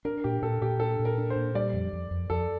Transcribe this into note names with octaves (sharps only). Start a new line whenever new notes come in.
D4 A#4
A#2 G4
A#2 A4
A#2 G4
D4 A4
A#2
A#4
D4
C5
A#2
G3 D5
F2
F2
F2
F2 A4